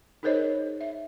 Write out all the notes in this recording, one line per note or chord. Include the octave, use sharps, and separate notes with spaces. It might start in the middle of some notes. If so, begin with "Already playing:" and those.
D#4 G#4 A#4 C5 C#5 D#5
E5